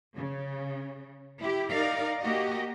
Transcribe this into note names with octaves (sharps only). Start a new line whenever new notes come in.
C#3
E4 G4
D#4 A#4 D5 F5
A#3 F#4 G4 D#5